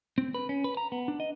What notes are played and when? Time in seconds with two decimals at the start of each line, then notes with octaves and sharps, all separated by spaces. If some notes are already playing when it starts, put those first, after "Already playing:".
0.18 C4
0.34 B4
0.49 C#4
0.64 B4
0.77 A#5
0.92 B3
1.08 D4
1.20 D#5